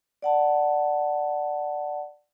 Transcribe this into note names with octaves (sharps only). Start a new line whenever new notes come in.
D5 F#5 A5